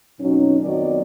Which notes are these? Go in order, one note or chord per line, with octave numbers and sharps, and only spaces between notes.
F2 B2 F#3 C#4 D#4
F2 D#3 F#3 B3 D5 D#5